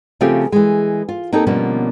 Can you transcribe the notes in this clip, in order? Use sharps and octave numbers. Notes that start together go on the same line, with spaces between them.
C#3 F3 A3 C4 F4 G4
E3 G#3
F4
A#3 C4 D#4 G4 A4
B2 D3 F3 G3 A#3 C#4